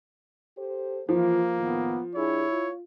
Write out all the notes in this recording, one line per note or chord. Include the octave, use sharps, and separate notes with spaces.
G4 A4 C5
E3 F3 A#3 F4
A2 D#3 B3
D4 E4 G4 G#4 C#5
F4